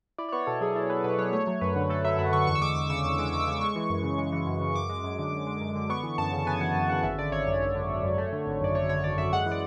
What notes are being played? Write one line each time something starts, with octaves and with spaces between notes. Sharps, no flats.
E4 D5
D5
B3 C#5
B2 A4
F#3 G#4
E4 A4
B3 B4
B2 B4
F#3 C#5
A3 C#5
F#3
F#2 B4
D3
A3 A4
F#3 E5
F#2 F#5
D3 C#6
E2 C#6
E6
G#3 D6
E2 D6
C#3 E6
E2 D6
E6
G#3 D6
E6
E2 D6
E6
C#3 D6
G#3 C#6
E3
F#2
C#3
G#3
E3
F#2
C#3
F#2 D6
G#3
F#2
D3
F#2
G#3
F#2
D3
B3 C#6
E3
F#2 A5
C#3
B3 G#5
E3 F#5
F#2
C#3 F#5
G#1 E5
D3 D5
G#1 C#5
F#2 C#5
G#1
D3
G#1
F#2
A3
D3
G#1
F#2 D5
A3 C#5
D3 C#5
G#1 D5
F#2 E5
G#3 F#5
E3
D5